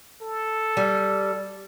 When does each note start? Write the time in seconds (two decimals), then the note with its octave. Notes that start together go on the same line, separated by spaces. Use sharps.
0.21 A4
0.77 G3